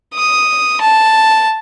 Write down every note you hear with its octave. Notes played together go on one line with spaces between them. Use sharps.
D#6
A5